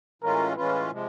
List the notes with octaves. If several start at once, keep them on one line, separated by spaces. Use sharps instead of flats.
A2 E3 G#3 C#4 F4 A#4
A2 E3 G#3 C#4 F4 B4
C3 F3 G#3